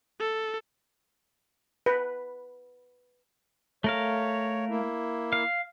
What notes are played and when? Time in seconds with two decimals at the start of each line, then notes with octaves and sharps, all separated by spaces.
0.20 A4
1.86 B4
3.84 A3 A#4 C#5 F5
4.69 A#3 E4
5.33 F5